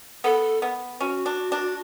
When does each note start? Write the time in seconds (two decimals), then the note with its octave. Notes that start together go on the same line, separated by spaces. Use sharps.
0.24 B3 A4
0.62 B3
1.00 C#4 F#4
1.26 D4
1.52 D4